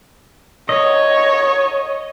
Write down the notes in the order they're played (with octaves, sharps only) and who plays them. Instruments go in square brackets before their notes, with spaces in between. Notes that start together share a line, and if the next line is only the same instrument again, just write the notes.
[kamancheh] C#5 [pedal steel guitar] D#5